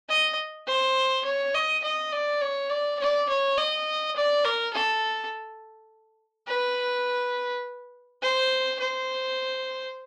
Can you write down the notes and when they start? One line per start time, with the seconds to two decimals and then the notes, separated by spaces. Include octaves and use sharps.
0.09 D#5
0.67 C5
1.25 C#5
1.54 D#5
1.83 D#5
2.12 D5
2.41 C#5
2.70 D5
2.99 D5
3.29 C#5
3.57 D#5
4.16 D5
4.44 A#4
4.73 A4
6.47 B4
8.22 C5
8.79 C5